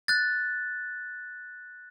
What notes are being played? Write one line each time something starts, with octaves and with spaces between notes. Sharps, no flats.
F#6 A6